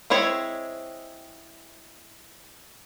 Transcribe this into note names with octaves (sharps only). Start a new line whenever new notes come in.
G#3 C4 E4 C#5